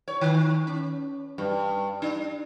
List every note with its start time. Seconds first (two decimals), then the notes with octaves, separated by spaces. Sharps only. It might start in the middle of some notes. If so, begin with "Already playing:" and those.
0.08 C#5
0.21 D#3
0.67 C#4
1.38 G2
2.02 D4